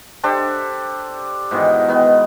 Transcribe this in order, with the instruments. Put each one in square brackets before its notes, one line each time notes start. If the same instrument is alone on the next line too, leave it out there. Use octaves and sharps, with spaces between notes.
[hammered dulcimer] D4 G4 A4 C5
G#2 B2 D#3 E3
D#3 B3